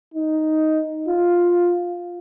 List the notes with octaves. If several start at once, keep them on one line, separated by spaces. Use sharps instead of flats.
D#4
F4